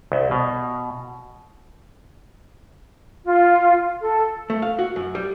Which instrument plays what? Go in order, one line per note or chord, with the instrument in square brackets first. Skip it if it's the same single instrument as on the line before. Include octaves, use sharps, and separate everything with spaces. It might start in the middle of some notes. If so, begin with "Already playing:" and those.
[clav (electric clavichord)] C2
B2
[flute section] F4
A4
[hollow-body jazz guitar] A3
F5
F#4
F#2
G3